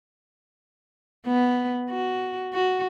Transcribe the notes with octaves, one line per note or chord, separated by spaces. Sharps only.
B3
F#4
F#4